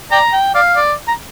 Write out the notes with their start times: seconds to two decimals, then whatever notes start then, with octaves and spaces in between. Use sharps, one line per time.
0.12 D5 G5 A#5
0.33 G5
0.55 D5 F5
0.76 D5
1.08 A#5